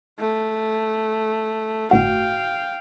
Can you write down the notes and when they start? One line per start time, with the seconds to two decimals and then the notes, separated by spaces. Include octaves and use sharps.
0.19 A3
1.91 G1 A2 F#4 F5 G5